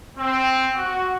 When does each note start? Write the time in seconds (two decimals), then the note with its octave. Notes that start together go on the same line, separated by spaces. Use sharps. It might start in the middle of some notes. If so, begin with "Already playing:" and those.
0.18 C4
0.74 F#4